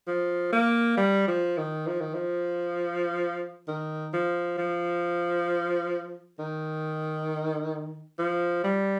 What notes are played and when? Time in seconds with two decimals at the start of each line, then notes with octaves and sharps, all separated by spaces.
0.07 F3
0.52 A#3
0.97 G3
1.28 F3
1.58 D#3
1.87 F3
2.00 D#3
2.14 F3
3.68 D#3
4.13 F3
4.58 F3
6.39 D#3
8.18 F3
8.63 G3